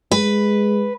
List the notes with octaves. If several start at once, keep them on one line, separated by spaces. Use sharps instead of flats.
G#3 B4